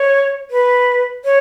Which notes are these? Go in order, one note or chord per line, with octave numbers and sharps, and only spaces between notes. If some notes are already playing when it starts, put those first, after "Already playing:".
Already playing: C#5
B4
C#5